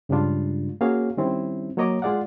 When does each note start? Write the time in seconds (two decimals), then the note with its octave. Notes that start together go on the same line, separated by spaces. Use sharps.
0.09 G2 C#3 G3 G#3 D4 F4
0.81 A#3 C#4 F#4 G#4 C#5 F5
1.17 D#3 G3 C4 C#4 E4
1.77 F#3 A#3 C#5 D#5 A#5 D6
2.02 G#3 F4 G#4 D5 F5 F#5